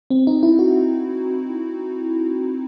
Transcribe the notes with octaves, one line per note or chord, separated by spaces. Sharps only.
C4
D#4
E4
F#4